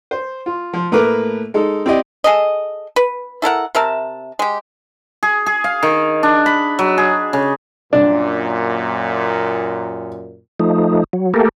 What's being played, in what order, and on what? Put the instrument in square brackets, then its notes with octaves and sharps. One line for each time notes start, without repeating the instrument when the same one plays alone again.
[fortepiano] C5
F4
F3
A2 A3 A#3 A#4 B4 D6
G#3 D#4 A4
C4 E4 G4 D5 D#5
[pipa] G#4 A4 D#5
B4
E4 A4 A#4 F#5
C3 A#4 E5 A5
G#3 G4
[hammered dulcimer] G#4
G#4
F5
D#3
D4
B5
F#3
G#4
C#3
[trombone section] F#2 A#2 [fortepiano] D4
[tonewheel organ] F3 A3 D#4
F#3
A3 A#3 G4 A4 A#4